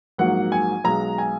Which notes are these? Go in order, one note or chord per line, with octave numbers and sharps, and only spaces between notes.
A#1 G#2 F#3 A#3 F#5
G#5
B1 B2 G#3 A#5
G#5